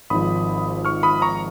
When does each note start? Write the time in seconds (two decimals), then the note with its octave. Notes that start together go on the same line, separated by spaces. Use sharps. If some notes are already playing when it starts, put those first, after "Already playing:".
0.10 G#1 G#2 F3 B5 D#6
0.85 C#6 F6
1.03 B5 D#6
1.22 A#5 C#6